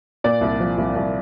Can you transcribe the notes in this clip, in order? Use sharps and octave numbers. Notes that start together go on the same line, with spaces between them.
A#2 D5
C2
F3
C2
C2